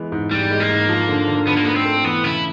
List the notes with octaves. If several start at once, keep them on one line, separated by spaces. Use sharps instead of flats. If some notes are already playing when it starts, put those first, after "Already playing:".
Already playing: E3 G#3 B3
G#2
G#2 G3
G#3
A#3
G#2
F3
D3
D3
D3 B3
A#3
A3 B3
C4
A3
E3 B3
C#3 E4